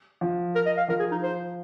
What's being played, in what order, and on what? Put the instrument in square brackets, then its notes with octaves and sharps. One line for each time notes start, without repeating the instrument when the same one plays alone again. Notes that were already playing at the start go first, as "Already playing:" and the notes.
[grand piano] F3
[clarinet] A#4
D#5
F5
[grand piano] F3 [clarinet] A#4
[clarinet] G#4
D#4
C5